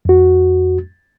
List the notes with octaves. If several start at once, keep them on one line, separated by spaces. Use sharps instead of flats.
F2 F#4